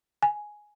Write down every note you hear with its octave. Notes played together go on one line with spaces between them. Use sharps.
G#5